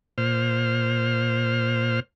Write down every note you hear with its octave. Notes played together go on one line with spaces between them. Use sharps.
A#2 C5 F6